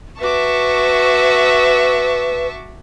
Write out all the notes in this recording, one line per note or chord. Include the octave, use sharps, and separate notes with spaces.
F#4 B4 E5 A5 C#6 D6